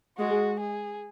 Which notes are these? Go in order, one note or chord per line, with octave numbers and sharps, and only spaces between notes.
G#3 F#4
G#4